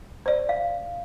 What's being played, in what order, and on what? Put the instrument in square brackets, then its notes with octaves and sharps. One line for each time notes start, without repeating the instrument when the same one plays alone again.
[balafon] C5 D5
[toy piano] F5